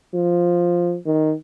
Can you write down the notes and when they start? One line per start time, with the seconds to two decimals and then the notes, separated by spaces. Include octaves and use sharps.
0.14 F3
1.06 D#3